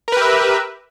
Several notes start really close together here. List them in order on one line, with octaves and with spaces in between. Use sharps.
A#4 B4 G4 E5